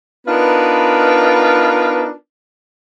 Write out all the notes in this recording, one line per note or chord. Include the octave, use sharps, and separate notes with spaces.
B3 D4 D#4 F4 A#4 B4